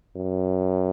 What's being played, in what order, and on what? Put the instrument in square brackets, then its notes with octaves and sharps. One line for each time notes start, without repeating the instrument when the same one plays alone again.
[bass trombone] F#2